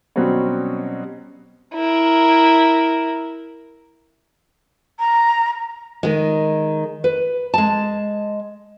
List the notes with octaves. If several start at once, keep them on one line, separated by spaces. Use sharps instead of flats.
B2 F#3 G3 C4 C#4
E4 A#4
A#5
D#3 G#3
B4
G#3 A5